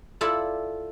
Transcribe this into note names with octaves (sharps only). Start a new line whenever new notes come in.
E4 F4 A4 D5 E5 B5